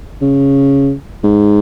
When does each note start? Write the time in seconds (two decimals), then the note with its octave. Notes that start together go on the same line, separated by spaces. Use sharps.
0.22 C#3
1.24 G#2